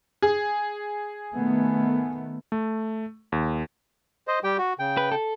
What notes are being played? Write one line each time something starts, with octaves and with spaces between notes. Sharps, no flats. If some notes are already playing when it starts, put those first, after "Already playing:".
G#4
D#3 A3 B3
A3
D#2
C5 D#5
G3 G4 G5
F#4
C#3 G5
B4
A4